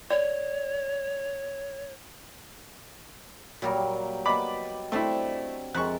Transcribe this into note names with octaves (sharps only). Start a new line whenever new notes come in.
C#5 D5
A#2 F#3 G3 A#3 G4 A#4
A#3 B3 D5 D#5 A5 B5 D6
A3 C4 D4 E4
F2 G#3 A#4 E5 A5 C#6 F#6